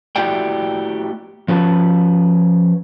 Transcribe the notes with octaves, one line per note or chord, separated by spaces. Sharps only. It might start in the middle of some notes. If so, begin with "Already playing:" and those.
A3 E4 F#4 G4 D5 G5
F3 C#4 B4 A5